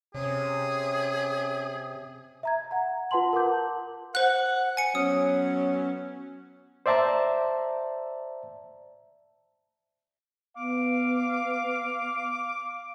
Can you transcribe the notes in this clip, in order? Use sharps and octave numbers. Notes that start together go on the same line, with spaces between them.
C3 C#4 G#4
E5 A#5 G#6
F#5 A#5
F4 B4 F#5 A5 C6 F#7
A#4 F#5 A5 D6 G6
C5 F#5 F#6
G#5 C#7
F#3 B3 C#4 D#6
C5 D5 E5 A5 A#5
B3 F5 D6